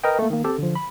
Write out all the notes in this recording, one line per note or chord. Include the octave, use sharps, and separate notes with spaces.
A#4 B4 D#5 G5
A3 A#3
D#3 A#3
C4 G4 A4
D3 F3
B5